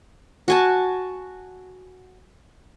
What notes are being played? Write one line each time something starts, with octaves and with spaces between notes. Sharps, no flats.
F#4 G#5 A5